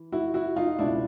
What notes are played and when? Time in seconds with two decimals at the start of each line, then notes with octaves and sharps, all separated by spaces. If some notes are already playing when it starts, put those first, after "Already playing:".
Already playing: E3
0.12 E4 F#4
0.34 E4 F#4
0.56 D#4 F4
0.78 C#2 B2 D4 E4